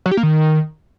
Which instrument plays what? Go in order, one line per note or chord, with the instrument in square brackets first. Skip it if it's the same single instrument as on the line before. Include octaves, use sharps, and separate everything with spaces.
[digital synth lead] F#3
G4
A#3
D#3